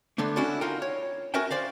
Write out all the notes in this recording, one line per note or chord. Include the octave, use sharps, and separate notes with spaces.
D3 A3 B3 D4
C#4 D4 E4 F#4 A4 D5
D#4 F4 A#4 F#5 G5
C#5
C#4 F#4 A#4 B4 E5 G5
C5 D5 F5